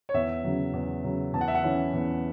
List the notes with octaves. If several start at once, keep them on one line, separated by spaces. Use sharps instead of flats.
C#5
E2 E5
C#3 F#3
E2
C#3 F#3
E2 A5
F#5
E5
F#5
E3 C#4 E4
E2